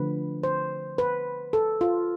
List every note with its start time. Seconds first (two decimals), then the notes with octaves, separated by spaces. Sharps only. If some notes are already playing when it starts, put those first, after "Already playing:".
Already playing: D3 F3 A3 B4
0.43 C5
0.98 B4
1.53 A4
1.81 F4